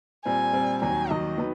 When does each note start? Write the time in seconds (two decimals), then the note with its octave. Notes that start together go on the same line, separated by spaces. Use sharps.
0.25 A#2 G3 C4 G#5
0.53 A#2 G3 C4
0.82 D#2 D#3 F#3 G#5
1.10 D#2 D#3 F#3 D#5
1.38 D#3 F#3 B3